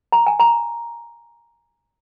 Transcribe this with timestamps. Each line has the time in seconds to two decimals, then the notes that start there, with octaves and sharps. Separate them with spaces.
0.12 A#5
0.26 G#5
0.40 A#5